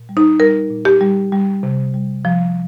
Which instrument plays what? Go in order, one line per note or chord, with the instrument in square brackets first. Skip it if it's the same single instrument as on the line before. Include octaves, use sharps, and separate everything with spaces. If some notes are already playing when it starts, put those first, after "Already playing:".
Already playing: [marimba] A#2
G3
D#4
G3 A#4
A#2
G4
G3
G3
C3
G3
F3